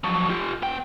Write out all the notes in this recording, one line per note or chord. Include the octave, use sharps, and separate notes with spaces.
F3 F#3
F4 G4
B3 G5